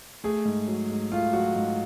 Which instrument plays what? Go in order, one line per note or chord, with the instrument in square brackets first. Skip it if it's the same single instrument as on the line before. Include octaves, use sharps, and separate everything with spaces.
[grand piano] A3 G#4
G#2
F#3
G#2
A3 F4
F#3 F#4
G#2